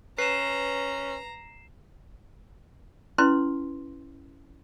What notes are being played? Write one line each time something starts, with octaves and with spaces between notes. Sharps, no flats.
C#4 B4 A#5 C7 E7
C#4 E4 B4 C6